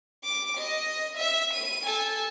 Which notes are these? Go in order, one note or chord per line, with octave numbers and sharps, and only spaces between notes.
D6
D#5
E5
D#7
A4 G#5